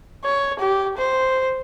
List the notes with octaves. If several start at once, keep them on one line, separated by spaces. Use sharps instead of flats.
C#5
G4
C5